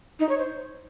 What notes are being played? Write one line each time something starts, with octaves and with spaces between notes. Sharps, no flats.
D#4
C#5
C5